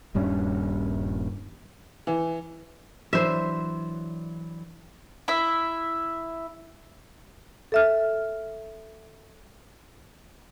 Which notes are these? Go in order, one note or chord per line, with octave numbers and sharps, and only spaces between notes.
D#1 G2 G3 C#4
E3
E3 F#3 D4 C5 E5
E4 E5
A4 E5 F6